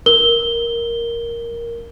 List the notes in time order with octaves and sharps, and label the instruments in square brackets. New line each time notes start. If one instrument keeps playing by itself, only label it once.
[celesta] A#4 G7